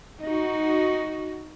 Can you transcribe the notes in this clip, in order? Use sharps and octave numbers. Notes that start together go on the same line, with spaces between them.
D#4 F#4